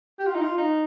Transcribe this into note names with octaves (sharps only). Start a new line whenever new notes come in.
G4
F4
D#4
F4
D#4